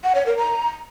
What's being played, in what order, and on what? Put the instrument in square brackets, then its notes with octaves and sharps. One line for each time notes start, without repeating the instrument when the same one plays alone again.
[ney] F#5
C#5
A#4
A#5